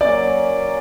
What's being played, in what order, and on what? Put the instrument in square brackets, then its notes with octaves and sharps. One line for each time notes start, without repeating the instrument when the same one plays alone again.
[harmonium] F#3 A#3 C#4 [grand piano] D5